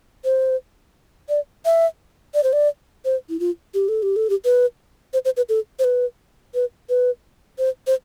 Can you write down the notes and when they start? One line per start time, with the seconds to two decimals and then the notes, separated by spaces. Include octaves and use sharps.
0.24 C5
1.29 D5
1.65 E5
2.34 D5
2.43 C5
2.53 D5
3.05 C5
3.29 E4
3.40 F4
3.74 G4
3.88 A4
4.03 G4
4.16 A4
4.30 G4
4.45 B4
5.13 C5
5.25 C5
5.37 B4
5.49 A4
5.79 C5
5.84 B4
6.54 B4
6.89 B4
7.58 C5
7.87 C5